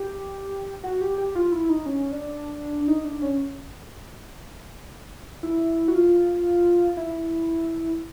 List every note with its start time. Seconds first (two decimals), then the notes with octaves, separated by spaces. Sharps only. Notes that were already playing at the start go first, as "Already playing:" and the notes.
Already playing: G4
0.84 F#4
1.01 G4
1.18 G4
1.35 F4
1.52 E4
1.69 D#4
1.86 C#4
2.12 D4
2.88 D#4
3.05 D4
3.22 C#4
5.43 E4
5.88 F#4
5.95 F4
6.97 E4